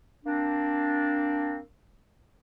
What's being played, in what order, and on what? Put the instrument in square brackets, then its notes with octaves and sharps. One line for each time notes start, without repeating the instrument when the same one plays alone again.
[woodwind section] A#3 C4 D4